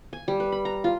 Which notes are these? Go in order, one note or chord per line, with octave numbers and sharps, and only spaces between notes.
G#5
G3
B4
B5
A#5
F4